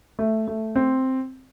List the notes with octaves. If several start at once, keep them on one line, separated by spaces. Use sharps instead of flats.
A3
A3
C4